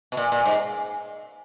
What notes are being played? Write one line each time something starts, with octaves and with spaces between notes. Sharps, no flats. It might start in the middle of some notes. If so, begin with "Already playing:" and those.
B2
A#2
A#2
G#2